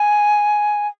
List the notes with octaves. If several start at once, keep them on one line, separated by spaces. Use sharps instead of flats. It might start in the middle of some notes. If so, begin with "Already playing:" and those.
Already playing: G#5